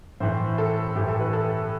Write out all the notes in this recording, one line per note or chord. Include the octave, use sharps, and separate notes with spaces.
A2 E3 C5
A4
A2 E3 G4
A4
B4
A4